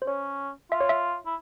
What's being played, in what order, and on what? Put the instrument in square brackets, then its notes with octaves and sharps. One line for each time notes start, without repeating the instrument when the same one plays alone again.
[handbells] C5
[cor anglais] C#4 [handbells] C#5
[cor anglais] F4 [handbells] E5
[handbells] C#5
E5
[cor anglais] E4